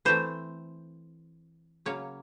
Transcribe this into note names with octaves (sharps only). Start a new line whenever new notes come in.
E3 A3 C4 C5
C#3 F#3 A#3 C#4 C#5